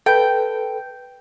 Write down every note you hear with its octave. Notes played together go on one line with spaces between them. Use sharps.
A4 B4 G5